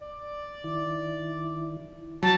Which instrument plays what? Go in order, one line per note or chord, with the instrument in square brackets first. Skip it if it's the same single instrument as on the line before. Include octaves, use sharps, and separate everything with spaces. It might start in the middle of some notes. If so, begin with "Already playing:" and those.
[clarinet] D5
[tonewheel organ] D#3 E4
[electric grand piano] F#3 [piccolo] A5